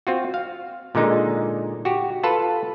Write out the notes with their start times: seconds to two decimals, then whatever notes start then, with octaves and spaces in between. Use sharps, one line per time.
0.07 C4 F4 F#4
0.34 F5
0.95 A#2 D3 G#3 D#4
1.85 F#4 G4
2.23 F4 A4 B4 A5